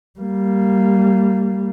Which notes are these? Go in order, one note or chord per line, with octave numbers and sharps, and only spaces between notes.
G3 A#3